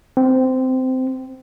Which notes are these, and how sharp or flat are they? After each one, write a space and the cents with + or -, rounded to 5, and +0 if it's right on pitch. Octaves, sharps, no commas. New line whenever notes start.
C4 -15